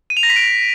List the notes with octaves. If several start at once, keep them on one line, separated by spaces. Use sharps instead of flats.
D#7
F7
A#6
B6
D7